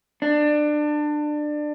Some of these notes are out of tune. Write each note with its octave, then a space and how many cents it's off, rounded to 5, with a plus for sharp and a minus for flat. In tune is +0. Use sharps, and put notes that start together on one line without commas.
D4 +25